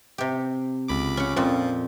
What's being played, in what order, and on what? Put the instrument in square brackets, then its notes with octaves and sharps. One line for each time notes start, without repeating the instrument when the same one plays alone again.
[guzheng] C3 G4
[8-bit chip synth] C#2 B5 D6
[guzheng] C#4 F#5
[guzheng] F2 A#2 C4 [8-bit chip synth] F3